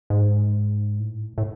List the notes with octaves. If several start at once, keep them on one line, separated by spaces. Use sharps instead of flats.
G#2
A2
A2